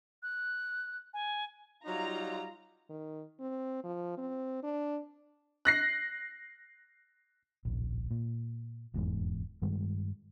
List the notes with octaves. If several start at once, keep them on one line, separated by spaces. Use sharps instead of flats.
F#6
G#5
F#3 G3 D#4 F4 A#5
D#3
C4
F3
C4
D4
F#6 A#6 C7
D1 A#1
A#2
F1 E2 G#2
G2 D#3 G3 G#3